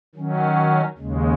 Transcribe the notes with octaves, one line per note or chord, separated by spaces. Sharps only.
D#3 F#3 C#4
D#2 C#3 G#3